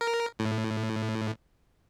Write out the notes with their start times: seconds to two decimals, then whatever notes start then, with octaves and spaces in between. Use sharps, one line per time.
0.01 A#4
0.39 A2